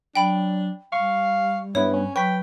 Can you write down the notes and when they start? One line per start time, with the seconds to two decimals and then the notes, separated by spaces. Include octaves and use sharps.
0.15 F#3 D4 G5 B5
0.92 G3 F5 C#6
1.75 G2 B3 E4 B4 C#5
1.93 C#4
2.16 F#3 B4 G5 C#6 B6